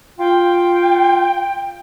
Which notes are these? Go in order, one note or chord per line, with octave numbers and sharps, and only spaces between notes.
F4 G5